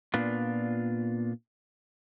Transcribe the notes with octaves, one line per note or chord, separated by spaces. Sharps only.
A#2 B3 D4 F4